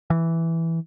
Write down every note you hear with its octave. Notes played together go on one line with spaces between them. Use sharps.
E3